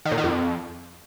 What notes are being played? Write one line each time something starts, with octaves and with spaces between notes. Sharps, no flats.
D#3
A#2
D#3
F2